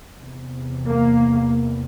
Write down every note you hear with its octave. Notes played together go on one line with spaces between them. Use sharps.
E2 C3
A#3